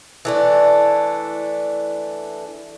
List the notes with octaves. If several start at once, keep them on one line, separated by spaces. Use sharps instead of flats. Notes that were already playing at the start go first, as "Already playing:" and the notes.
E3 A3 D4